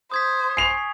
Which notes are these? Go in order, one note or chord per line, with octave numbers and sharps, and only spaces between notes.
C5 D#6 G#6 B6
G#5 C#6 C7 F7